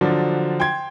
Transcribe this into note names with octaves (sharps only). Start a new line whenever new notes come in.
D3 F3 F#3 D4
G5 C6 G#6